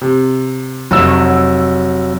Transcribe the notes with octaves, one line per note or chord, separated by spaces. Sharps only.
C3
F1 F#3 E6